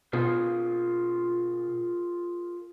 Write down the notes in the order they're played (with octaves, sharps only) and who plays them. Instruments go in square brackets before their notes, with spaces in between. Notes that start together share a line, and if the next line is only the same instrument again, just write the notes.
[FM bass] B2 [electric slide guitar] F4 G#4 A#4